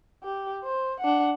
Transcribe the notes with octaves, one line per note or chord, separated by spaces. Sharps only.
G4
C5
D4 F#5